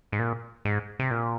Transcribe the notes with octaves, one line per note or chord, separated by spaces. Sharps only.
G#2
A#2
G#2
C3
A#2